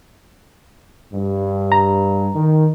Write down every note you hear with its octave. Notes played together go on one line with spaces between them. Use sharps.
G2
A#5
D#3